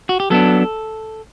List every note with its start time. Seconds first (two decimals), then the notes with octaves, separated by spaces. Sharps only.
0.09 F#4
0.20 G4
0.30 F#3 B3 D4 A4